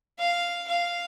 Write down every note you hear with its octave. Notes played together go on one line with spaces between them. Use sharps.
F5
F5